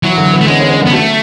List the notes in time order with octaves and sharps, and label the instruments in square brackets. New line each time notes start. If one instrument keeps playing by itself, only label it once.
[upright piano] E3 [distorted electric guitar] F#3
[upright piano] D3
B3
[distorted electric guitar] A3
[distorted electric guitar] G#3 [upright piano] C#4
[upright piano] C#4
C#4
[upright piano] D3 [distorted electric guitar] B3
[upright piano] F#3 [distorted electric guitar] A3